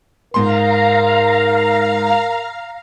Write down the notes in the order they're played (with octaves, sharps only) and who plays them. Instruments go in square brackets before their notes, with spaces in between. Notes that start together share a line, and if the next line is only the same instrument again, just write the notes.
[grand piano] G#2 C6 [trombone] A#4 [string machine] F5 A#5